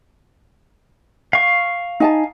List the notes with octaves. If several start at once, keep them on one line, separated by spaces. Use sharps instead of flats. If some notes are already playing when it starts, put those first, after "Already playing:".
F5 C#6
D#4 G#5 A5